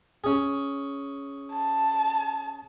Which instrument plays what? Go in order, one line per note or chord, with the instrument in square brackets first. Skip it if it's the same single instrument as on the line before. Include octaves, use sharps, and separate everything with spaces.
[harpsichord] C#4 G#4
[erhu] A5